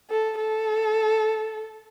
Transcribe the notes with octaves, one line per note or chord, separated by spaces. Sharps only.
A4
A4